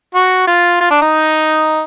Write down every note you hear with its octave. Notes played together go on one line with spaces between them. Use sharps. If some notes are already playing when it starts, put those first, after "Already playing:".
F#4
F4
F4
D4
D#4